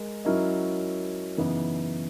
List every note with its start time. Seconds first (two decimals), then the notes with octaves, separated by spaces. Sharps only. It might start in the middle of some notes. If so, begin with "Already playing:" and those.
Already playing: G#3 A#4
0.25 F#3 C#4 E4 A#4 D#5
1.37 F#2 C#3 E3 B3 D#4